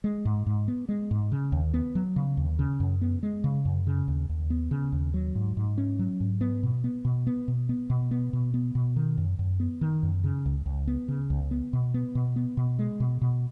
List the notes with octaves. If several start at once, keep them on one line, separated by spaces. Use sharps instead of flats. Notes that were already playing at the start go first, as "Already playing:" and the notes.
G#3
G#2
G#2
B3
G#3
G#2
C#3
D#2
B3
F#3
C#3
D#2
C#3
F#2
B3
G#3
C#3
F#2
C#3
D#2
D#2
B3
C#3
D#2
F#3
G#2
G#2
C#4
F#3
G#2
B3
B2
B3
B2
B3
B2
B3
B2
B3
B2
B3
B2
D#3
F#2
F#2
B3
D#3
F#2
C#3
C#2
C#2
B3
C#3
C#2
B3
B2
B3
B2
B3
B2
G#3
B2
B2